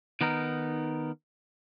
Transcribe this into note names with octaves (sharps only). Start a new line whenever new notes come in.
D#3 B3 D#4 A#4